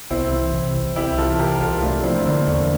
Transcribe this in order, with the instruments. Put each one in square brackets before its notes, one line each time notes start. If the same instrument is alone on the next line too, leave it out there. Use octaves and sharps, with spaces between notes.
[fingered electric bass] C2 [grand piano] C4 E4
[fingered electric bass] E3
C3
C2
[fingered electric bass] C2 [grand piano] E4 G4
[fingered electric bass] E3 [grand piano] F4 A4
[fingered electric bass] C3 [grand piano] G4 A#4
[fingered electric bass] C2 [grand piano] F4 A4
[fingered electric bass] A3 [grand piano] D4 F4
[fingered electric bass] F3 [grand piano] C4 E4
[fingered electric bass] D3 [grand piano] A#3 D4
[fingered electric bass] E2 [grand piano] A3